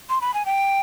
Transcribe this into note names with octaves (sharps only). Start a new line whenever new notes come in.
C6
B5
G#5
G5